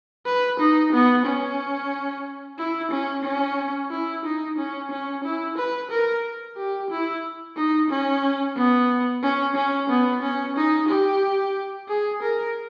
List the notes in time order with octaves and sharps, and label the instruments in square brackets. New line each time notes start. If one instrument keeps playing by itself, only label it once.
[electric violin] B4
D#4
B3
C#4
E4
C#4
C#4
E4
D#4
C#4
C#4
E4
B4
A#4
G4
E4
D#4
C#4
B3
C#4
C#4
B3
C#4
D#4
G4
G#4
A#4